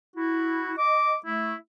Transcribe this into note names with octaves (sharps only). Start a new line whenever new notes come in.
E4 F#4
D#5 D6
A3 E4